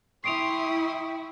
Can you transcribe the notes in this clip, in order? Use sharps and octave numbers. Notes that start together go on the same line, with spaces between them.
E4 G5 C6 C#6 D#6 C7 D7 F7